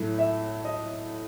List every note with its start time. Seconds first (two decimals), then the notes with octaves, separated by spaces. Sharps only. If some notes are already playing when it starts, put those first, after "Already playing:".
Already playing: A2 F#3 A3
0.19 E5
0.65 D#5